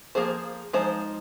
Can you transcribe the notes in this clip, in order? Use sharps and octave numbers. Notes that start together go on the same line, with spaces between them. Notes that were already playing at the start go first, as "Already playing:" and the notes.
F3 A#3 G#4 C5
F3 G#3 D#4 C5